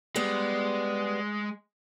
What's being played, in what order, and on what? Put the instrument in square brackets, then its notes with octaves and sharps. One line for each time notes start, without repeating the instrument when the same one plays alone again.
[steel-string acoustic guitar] G3 B3 [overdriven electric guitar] G#3